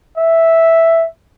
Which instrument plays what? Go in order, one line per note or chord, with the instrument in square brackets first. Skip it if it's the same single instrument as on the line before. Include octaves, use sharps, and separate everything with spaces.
[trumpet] E5